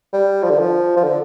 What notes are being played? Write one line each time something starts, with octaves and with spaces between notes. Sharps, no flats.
G3
F3
D3
F3
F3
D3